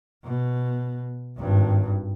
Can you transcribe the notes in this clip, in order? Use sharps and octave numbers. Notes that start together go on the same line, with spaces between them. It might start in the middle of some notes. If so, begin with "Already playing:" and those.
B2
G#1 G2